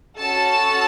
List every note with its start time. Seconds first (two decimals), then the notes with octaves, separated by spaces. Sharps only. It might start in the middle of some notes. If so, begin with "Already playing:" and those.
0.20 C#4 F#4 A4 A5